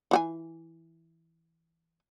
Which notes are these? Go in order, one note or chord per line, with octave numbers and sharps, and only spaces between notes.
E3 F#4 G#5